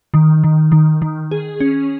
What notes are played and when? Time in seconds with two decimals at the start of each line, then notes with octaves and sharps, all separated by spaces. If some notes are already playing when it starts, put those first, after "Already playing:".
0.14 D#3
0.44 D#3
0.72 D#3
1.02 D#3
1.31 G#4
1.60 C#4